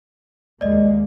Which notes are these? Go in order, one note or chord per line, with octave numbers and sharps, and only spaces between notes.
D#2 G#3 A#3 D5 D#5